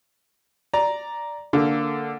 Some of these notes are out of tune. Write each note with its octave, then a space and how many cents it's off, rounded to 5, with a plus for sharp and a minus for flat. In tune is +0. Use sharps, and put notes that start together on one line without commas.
D5 +0 A#5 +5
D3 +0 A#3 -15 A4 -10